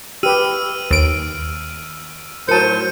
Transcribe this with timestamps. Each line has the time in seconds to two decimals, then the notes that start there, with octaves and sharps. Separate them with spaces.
0.23 G4 B4 E6 F6 D#7
0.91 D#2 D7
2.49 A2 F#3 A#4 C5 A5 C#7 D#7